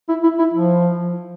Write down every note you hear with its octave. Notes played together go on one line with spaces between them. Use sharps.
E4
E4
E4
F3